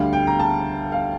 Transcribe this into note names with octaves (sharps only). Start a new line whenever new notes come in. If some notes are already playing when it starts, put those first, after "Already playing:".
Already playing: D2 D3 G3 F5
G5
A#5
A5
F5